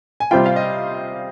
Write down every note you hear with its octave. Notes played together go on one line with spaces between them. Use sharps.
G#5
C3 G3 C4 F4 G5
F5
D#5